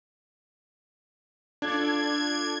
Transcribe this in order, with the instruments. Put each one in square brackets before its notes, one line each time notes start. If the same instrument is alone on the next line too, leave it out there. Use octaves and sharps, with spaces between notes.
[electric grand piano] D4 [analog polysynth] F4 A4 D5 [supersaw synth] G#6